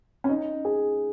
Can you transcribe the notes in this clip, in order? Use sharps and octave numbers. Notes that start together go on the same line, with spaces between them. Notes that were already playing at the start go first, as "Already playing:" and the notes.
C#4
D#4
G#4